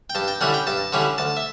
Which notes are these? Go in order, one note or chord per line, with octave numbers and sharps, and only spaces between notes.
G5
G2 A5
G5
D3 G3 C#4 E4 F#5
G5
G2 A5
D3 G3 C#4 E4
D2 A5
E5